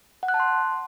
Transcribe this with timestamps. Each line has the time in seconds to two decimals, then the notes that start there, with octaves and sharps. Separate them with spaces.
0.23 F#5
0.28 F#6
0.34 A5
0.40 C6